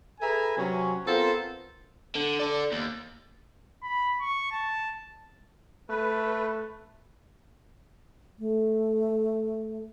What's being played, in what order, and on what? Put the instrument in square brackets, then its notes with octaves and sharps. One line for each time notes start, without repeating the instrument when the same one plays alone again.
[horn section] G#4 A4 B4 E5 G#5 A#5
C3 F#3 C#4
B3 C4 F4 A4 A#4 C5
[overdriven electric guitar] D3
A4 D5
D#2
[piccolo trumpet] B5
C#6
A5
[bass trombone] A3 [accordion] B4
[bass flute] A3